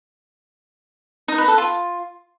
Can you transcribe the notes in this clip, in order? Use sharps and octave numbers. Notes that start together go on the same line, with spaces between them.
D#4
B4
A4
F4